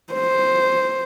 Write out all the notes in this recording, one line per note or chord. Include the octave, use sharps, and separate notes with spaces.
C5